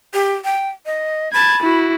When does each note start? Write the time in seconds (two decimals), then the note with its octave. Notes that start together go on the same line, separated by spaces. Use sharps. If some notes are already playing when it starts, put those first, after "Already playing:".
0.14 G4
0.45 G5
0.86 D#5
1.33 A5 B5 G#6
1.62 E4 F#4